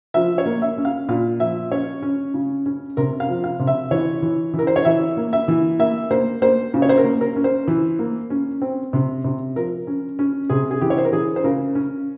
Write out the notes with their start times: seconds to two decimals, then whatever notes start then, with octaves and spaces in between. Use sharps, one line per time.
0.14 F3 E5
0.38 C#5
0.46 A#3
0.62 E5
0.78 C#4
0.85 F5
1.09 A#2 F5
1.40 F3 E5
1.71 C#4 C#5
2.02 C#4
2.34 C#3
2.66 C#4
2.97 C3 A#4
3.20 F5
3.29 F3
3.44 F5
3.60 C3
3.67 E5
3.91 E3 C#5
4.22 E3
4.54 E3
4.59 A#4
4.67 C5
4.76 C#5
4.85 E3 E5
5.17 A#3
5.33 E5
5.48 E3
5.79 A#3 E5
6.11 A#3 C5
6.42 A#3 C5
6.74 C#3
6.82 C#5
6.89 C5
6.98 A#4
7.04 A#3
7.21 A#4
7.36 C#4
7.44 C5
7.68 E3
7.99 A#3
8.30 C#4
8.62 C4
8.93 C3
9.24 C3
9.56 F3 A#4
9.87 C#4
10.19 C#4
10.50 C3 G#4
10.71 G#4
10.81 E3 G4
10.90 C#5
10.98 C5
11.05 A#4
11.13 E3 G#4
11.36 C5
11.44 C#3 A#4
11.75 C#4